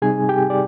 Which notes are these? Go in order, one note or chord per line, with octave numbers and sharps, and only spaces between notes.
C3 G3 C4 D#4 G#4 G#5
G4 G5
D5